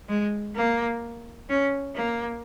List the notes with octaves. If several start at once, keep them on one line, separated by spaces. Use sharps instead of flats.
G#3
A#3
C#4
A#3